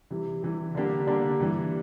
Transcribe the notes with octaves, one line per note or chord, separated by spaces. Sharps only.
C3 E3 G3
C3 E3 G3
D3 G3 A#3 D4 G4
D3 G3 A#3 D4 G4
G2 E3 G3